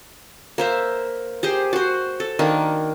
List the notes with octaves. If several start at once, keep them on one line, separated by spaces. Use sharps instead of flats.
A#3 C5 E5
G4 G#4 C5
F#4 C5
A4
D#3 A#3 D4